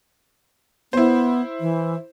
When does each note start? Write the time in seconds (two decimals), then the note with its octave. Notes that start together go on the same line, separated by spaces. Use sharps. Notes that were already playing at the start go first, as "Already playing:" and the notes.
0.93 B3 E4 C5
1.60 E3